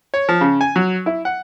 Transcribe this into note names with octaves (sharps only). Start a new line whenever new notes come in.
C#5
F3
C#3
G#5
F#3
E4
F#5